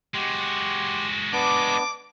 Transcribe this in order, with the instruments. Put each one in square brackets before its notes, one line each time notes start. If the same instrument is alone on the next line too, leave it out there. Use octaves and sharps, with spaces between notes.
[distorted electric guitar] G#3 F#4 [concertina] G4 C6
[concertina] B3 D4 D5 [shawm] D6